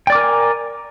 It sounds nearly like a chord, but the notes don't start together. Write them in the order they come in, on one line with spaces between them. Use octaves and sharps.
G5 D5 D6 A#4 G#5